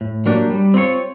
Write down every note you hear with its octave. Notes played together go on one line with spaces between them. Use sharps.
A2
F#3 A#3 D4 G4
G3
C4 F4 A#4 C#5